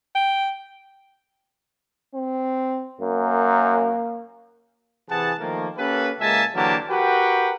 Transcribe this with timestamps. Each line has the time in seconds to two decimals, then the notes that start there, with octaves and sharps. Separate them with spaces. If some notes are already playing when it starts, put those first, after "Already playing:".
0.15 G5
2.15 C4
3.01 F#2 A#3
5.09 C3 E3 G#4 F#5 A5
5.40 D#3 F3 A3 A#3
5.77 A#3 C#4 G4 A4 B4
6.20 C#2 G#3 A#3 E5 G#5 A5
6.55 D3 E3 F#3 A#3 G4 A5
6.90 F#4 G4 A#4 B4 F#5 G5